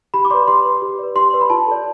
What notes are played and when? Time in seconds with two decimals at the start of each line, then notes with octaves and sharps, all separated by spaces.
0.14 G4 B5
0.25 D6
0.30 B4 D5 C6
0.48 G4 C6
0.65 B4 D5
0.82 G4
0.99 B4 D5
1.15 G4 C6
1.33 B4 D5
1.41 B5
1.50 F4 A5
1.67 A4 D5